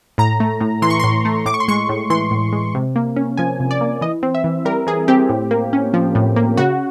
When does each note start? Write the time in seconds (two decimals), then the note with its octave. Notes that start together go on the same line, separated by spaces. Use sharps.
0.18 A2 A#5
0.40 A3
0.61 A2
0.82 E3 C6
0.90 C#6
1.00 C6
1.04 A2
1.25 A3
1.46 A2 D6
1.54 C#6
1.60 C6
1.68 G#3 C#6
1.89 A2
2.10 E3 C6
2.31 A2
2.53 G#3
2.75 C3
2.96 A#3
3.16 C#4
3.37 F3 G#5
3.60 C3
3.71 D5
3.81 A#3
4.01 E3 D#5
4.23 C4
4.35 E5
4.44 E3
4.65 G3 A#4
4.87 E3 G#4
5.08 C4 G4
5.29 A2
5.51 A#3
5.73 C#4
5.94 F3
6.15 A2
6.36 A#3
6.57 C#3 F#4